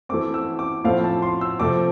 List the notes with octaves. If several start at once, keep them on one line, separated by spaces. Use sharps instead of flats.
E3 A3 C4 D6
E6
D6
A2 F3 A3 C4 F5
A5
C6
E6
C3 F3 A3 C4 D6